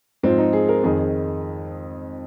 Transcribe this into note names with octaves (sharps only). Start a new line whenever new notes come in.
G#2 F3 C4
D#4
G#4
A#4
F2 D#3 G#4
G#4